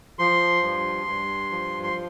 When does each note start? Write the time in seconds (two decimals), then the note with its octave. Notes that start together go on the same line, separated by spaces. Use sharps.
0.19 F3 C6
0.63 G2
1.07 G2
1.51 F3
1.83 C6